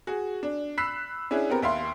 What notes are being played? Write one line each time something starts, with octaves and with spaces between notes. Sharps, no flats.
F#4 G#4
D4
B5 E6 F#6 B6 C7 E7
C#4 D4 E4 G#4
B3 C4 G4 A#4
D#2 E5 F5 C6